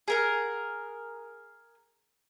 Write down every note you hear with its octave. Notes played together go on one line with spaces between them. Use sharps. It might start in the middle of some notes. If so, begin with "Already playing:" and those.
G#4 A#4 F#5